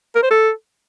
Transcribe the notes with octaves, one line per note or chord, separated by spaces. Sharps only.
A#4
C5
A4